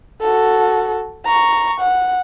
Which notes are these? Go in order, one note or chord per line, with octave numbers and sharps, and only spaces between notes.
F#4 A4
A#5 C#6
F#5